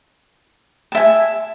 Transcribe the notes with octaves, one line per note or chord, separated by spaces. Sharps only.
E5 G#5 A5